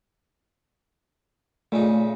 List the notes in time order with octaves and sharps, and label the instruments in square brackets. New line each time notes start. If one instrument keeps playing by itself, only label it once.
[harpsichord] A#2 C#3 D#4 [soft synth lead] A3